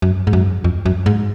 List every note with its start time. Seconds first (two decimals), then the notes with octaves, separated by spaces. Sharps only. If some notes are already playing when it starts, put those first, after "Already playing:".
0.02 F#2
0.27 G#2
0.33 F#2
0.64 F2
0.86 F#2
1.06 G#2